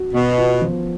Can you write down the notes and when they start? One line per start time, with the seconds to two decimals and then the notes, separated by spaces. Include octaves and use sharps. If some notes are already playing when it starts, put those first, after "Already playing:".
Already playing: F#4
0.14 B2 B3
0.38 F4
0.62 F3